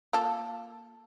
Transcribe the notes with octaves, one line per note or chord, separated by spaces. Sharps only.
A#3 F4 A4